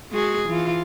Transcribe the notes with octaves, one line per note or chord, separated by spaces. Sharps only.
G#3 F#4 G#4
E3 F4